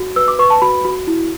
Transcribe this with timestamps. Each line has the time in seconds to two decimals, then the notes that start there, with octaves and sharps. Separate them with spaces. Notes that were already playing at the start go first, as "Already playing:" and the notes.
Already playing: F#4
0.16 B4 E6
0.28 D6
0.39 B4 C#6
0.50 A5
0.62 F#4 B5
0.85 F#4
1.07 E4